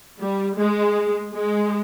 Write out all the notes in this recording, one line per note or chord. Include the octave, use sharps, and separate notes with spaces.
G3
G#3
G#3